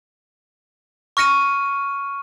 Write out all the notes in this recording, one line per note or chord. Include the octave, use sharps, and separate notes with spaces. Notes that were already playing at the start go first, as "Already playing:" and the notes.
C#6 F6 A#6 C#7 D#7